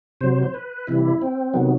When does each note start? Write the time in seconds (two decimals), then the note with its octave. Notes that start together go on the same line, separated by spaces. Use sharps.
0.21 C3 F#3 C5
0.43 C5
0.54 B4
0.87 C3 E3 G3 E4
1.22 C4
1.54 C3 D#3 F#3 B3